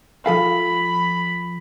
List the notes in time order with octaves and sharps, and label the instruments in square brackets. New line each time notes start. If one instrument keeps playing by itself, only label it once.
[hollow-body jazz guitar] F3 A4 F5 [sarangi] B5